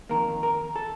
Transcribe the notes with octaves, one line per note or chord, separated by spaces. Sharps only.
F2 D#3 A#3 A#4
A#4
A4